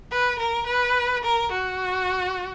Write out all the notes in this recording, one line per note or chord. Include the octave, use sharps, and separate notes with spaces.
B4
A#4
B4
A#4
F#4